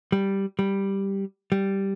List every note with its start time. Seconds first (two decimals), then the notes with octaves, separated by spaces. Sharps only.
0.12 G3
0.59 G3
1.52 G3